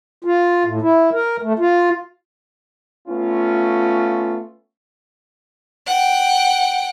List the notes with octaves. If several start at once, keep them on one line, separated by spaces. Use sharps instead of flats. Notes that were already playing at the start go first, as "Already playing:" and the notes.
F4
A2
E4
A#4
A3
F4
A3 B3 C#4 F4
F#5 G5